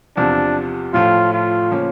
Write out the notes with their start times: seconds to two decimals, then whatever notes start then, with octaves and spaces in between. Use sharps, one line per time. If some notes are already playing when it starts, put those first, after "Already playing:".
0.17 E2 C3 F3 D4
0.94 A2 F3 A3 F4
1.33 F4
1.71 C#3 F3 A#3 C#4